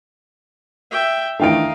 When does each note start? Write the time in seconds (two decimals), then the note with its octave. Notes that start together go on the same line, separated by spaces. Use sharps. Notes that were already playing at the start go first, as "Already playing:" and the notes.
0.91 E5 G5
1.39 D#3 E3 A3 D4 D#4 F5 G5 D7